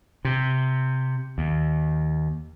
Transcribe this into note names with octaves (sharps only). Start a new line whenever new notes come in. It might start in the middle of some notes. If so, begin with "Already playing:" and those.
C3
D#2